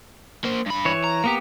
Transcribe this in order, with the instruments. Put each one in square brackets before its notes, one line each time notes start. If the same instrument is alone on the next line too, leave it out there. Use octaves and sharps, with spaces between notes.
[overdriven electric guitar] A#3 C5
G2 B5
[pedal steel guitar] E3 C#5
[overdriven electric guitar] A#5
[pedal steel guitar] A#3 B3 G4